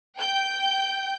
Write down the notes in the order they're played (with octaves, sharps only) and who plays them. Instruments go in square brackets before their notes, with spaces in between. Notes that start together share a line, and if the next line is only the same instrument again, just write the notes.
[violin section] G5 G6